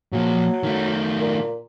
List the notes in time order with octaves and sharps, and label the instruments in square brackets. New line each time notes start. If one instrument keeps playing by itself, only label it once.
[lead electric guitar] A#2 F3 [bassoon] F#3
[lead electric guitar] D#3 A3
[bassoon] A#2